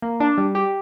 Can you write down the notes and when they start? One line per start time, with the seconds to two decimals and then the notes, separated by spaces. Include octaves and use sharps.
0.02 A#3
0.20 D4
0.38 G3
0.55 G4